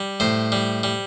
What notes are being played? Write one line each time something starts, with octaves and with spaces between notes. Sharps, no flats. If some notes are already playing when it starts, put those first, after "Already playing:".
Already playing: G3
A2 C5
G3
G3